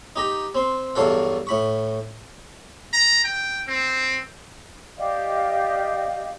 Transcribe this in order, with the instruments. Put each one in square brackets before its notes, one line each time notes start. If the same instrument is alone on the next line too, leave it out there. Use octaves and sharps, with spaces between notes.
[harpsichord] D#4 G4 A#5
C4 C6
E2 G2 F#3 A4 F5
A2 B5 C#6
[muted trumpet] A#5
G5
C4
[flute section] G4 D5 D#5 F5